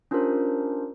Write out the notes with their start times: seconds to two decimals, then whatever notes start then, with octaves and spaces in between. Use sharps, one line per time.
0.11 C#4 D4 F4 G4 A#4 C5